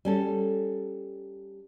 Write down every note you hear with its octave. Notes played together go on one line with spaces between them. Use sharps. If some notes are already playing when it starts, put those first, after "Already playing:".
G3 C#4 A4